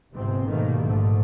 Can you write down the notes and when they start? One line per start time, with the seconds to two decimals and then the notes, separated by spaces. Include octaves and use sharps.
0.14 G1 G#2 C3 C4
0.46 G#2 B2 D#3 G3 A3 A#3
0.80 A#1 G#2 D3 A3